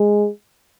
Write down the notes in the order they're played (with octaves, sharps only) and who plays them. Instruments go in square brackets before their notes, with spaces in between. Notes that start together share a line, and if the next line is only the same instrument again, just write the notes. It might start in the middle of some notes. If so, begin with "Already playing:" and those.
Already playing: [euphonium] G#3